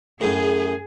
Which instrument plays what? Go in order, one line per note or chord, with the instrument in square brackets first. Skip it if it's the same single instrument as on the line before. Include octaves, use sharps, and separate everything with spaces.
[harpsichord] F#2 A2 [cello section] G#4